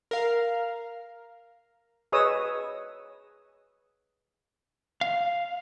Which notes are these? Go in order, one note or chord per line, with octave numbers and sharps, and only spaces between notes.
A#4 F5
G#4 B4 C#5 D#5 D#6 E6
F5